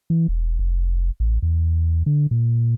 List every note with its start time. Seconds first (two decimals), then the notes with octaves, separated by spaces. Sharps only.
0.10 E3
0.28 E1
0.59 F1
1.20 A1
1.42 E2
2.06 D3
2.31 A#2